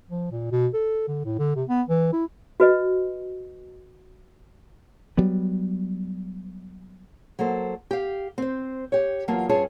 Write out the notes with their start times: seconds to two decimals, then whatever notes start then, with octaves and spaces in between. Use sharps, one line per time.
0.11 F3
0.31 A#2
0.52 B2
0.74 A4
1.08 D3
1.25 A2
1.39 D3
1.56 C3
1.69 B3
1.89 E3
2.13 E4
2.60 F#4 B4 D#5
5.17 F#3 G3 B3
7.39 F#3 A#3 A4 C5
7.91 G4 F5
8.38 C4 C5
8.92 G4 C#5
9.28 E2 F#3 A#3 F4 A5
9.49 G2 C#4 F4 G#4 C#5 A5